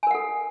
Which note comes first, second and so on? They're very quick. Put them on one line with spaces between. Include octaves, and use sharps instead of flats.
G#5 A#4 F#5 A4